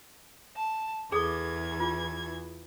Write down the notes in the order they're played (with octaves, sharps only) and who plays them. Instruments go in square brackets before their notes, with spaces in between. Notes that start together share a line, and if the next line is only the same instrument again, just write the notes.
[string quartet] A5
[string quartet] E2 E3 G#6 [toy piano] G#4 A4 D6
[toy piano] F4